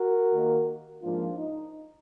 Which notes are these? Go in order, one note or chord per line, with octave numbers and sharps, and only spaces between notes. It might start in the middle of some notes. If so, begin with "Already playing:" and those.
Already playing: F#4 A#4
D#2 D#3 A#3
G#2 F3 A#3 D4 F4
D#4